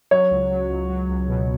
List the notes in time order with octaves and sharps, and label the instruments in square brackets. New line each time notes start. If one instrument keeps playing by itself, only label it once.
[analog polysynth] F#3 [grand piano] C#5
[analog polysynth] C#2
F#3
C#2
F#3
C#2
B2